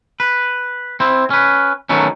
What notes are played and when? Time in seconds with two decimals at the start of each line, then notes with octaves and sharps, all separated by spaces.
0.20 B4
1.00 C4 E4
1.30 C#4 B4
1.89 D#3 F#3 A3 B3 C#4